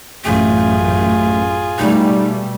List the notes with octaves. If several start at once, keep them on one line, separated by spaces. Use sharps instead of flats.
A1 F#2 A3 F4 G#4
B2 G3 A3 D#4